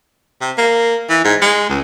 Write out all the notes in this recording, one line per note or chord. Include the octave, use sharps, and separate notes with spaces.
C3
A#3
E3
G#2
G#3
C#2